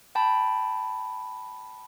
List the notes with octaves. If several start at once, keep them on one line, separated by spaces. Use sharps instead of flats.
G5 A5 B5